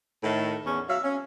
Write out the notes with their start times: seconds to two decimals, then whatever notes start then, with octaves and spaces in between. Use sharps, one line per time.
0.24 A2 D#3 A3 A4
0.65 E2 C#4
0.89 F#3 E5 F5
1.04 C#4